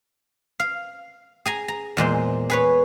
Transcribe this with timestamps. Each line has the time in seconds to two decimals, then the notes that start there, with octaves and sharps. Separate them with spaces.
0.60 F5
1.46 G#4 G#5 A#5
1.68 A#5
1.97 E2 A#2 G#3 C5
2.50 G#4 B4 C#5